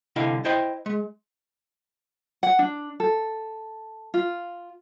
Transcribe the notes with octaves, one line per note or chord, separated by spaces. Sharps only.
C2 D3 E4 D#5 F5
E4 C5 D#5 G5
G#3
F#5
D4
A4
F4